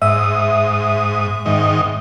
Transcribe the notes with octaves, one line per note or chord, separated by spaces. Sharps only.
G#2 E5 D#6
G#2 D#3 D#5